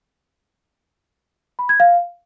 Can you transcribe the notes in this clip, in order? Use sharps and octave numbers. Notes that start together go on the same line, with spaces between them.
B5
G#6
F5